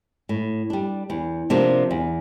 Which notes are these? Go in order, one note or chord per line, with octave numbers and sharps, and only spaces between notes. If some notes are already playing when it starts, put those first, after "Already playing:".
A2
G3 D4
E2
C3 F3 A#3 D4
E2